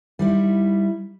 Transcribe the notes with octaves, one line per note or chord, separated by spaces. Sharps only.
G3 D#4 E4